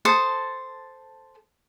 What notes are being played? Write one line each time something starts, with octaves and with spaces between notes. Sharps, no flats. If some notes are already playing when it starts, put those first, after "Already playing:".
A4 C5 A5 D#6